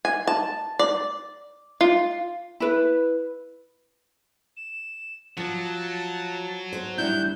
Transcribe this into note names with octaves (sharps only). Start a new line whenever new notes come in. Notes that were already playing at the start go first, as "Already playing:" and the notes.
G#5
A5
D5
F4
E4 B4
E7
F3 F#3 A5
C5
G3 D4 E4 F#6 G6